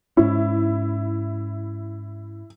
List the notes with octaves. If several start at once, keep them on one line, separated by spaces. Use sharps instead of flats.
G#2 C#4 E4